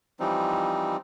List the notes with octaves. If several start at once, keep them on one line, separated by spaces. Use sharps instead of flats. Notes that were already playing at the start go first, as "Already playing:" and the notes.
E3 F3 G3 C4 D#4